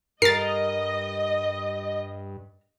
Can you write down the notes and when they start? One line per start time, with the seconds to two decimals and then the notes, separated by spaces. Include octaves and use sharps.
0.22 G2 A#4 D#5 A6 C7